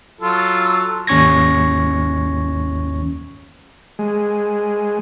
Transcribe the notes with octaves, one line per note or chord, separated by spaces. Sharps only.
F#3 F4 A4
G#1 D#2 C#4 C#6 G#6 A#6
G#3